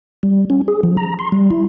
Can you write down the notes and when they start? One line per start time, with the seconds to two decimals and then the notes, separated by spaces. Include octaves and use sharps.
0.23 G3
0.50 C#4
0.68 G#4
0.83 F3
0.97 A#5
1.19 C6
1.32 G3
1.51 E4